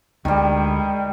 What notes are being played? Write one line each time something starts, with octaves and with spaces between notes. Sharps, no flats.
D2 D3 D#3 G3 G#3